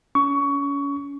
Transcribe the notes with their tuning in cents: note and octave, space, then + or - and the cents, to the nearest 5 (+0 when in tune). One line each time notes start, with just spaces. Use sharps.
C#4 +30 C#6 +20